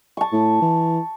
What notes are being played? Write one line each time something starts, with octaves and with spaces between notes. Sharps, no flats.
A5 C#6
A2
E3